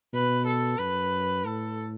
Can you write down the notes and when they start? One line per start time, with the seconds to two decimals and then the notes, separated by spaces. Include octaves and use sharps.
0.13 B2 B4
0.46 A4
0.78 F#2 B4
1.45 A2 A4